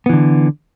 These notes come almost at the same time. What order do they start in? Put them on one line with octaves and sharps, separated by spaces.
B3 E3 D3